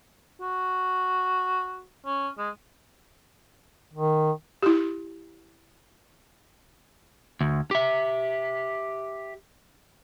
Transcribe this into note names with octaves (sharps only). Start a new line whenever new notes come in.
F#4
C#4
G#3
D#3
E4 G4
D2
G4 E5